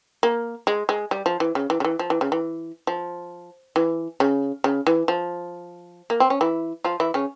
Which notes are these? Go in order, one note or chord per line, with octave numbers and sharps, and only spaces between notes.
A#3
G#3
G#3
G3
F3
E3
C#3
E3
C#3
E3
F3
E3
C#3
E3
F3
E3
C#3
C#3
E3
F3
A#3
C4
C#4
E3 E4
F3 F4
E3 E4
C#3 C#4